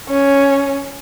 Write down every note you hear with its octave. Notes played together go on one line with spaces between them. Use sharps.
C#4